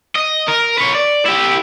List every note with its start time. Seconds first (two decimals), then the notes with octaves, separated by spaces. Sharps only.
0.15 D#5
0.48 A#4
0.78 B4 C#5
0.95 D5
1.26 E4 G4